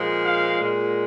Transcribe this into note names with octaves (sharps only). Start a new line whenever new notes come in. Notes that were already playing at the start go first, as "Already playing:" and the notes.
Already playing: A#2 F3 G#3
F5
A#2 G#3